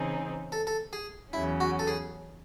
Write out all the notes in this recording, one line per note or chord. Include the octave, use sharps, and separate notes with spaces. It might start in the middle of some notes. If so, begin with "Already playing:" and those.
Already playing: C#3 E3 C4 D#4 G#4
A4
A4
G#4
E2 C#3 F#3 C#4 E4
F#4
A4
G#4